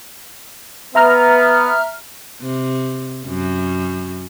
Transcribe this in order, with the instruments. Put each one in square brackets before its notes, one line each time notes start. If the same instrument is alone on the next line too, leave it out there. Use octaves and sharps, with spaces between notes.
[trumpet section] B3 [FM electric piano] E5 A#5 F6
[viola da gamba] C3
F#2